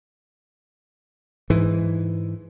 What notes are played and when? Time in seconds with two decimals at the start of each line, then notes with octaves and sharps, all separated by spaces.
1.50 G#2 E3